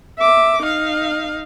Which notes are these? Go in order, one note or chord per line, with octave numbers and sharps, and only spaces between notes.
E5 D6
D#4 F5